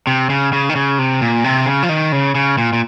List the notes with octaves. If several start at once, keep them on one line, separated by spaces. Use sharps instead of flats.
C3
C#3
C#3
D#3
C#3
C3
A#2
C3
C#3
F3
D#3
C#3
C#3
A#2
A#2